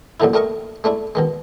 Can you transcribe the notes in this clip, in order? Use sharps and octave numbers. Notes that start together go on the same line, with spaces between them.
A#1 F#2 A2 D3 D#4 E4
G3 A3 A#4 D#5 C#6
G#3 A3 D4 E4
B2 D#3 G#3